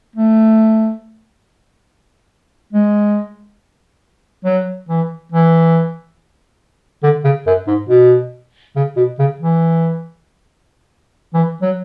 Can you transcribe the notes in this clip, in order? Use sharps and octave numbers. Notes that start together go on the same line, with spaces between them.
A3
G#3
F#3
E3
E3
D3
C#3
F#2
G#2
B2
C#3
B2
C#3
E3
E3
F#3